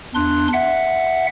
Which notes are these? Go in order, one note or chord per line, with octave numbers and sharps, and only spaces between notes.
E2 D4 C6 F#6
E5 F#5